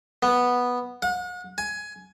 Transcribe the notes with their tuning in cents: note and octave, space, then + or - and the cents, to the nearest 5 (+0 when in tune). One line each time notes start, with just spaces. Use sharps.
B3 -5
F#5 -40
G#5 +15